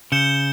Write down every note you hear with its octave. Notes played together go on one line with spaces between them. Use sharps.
C#3 G6 C#7 E7 G7